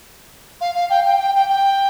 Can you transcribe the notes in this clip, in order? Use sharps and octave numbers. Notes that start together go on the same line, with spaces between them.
F5
F5
G5
G5
G5
G5
G5